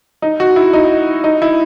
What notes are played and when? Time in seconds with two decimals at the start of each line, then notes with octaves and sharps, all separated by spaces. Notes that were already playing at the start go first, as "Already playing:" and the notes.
0.22 D#4
0.40 F#4
0.56 E4
0.73 D#4
1.24 D#4
1.42 E4